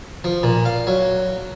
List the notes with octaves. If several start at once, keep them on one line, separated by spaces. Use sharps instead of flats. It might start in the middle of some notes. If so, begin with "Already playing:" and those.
F3
A#2
F5
F#3